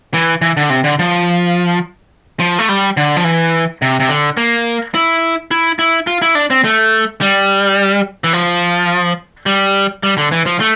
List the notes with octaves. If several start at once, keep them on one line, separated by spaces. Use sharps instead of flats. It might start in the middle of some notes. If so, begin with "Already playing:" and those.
E3
E3
D3
C3
D3
F3
F3
A3
G3
D3
F3
E3
C3
C3
D3
A#3
E4
E4
E4
F4
E4
D4
C4
A3
G3
E3
F3
G3
G3
D3
E3
F3
A3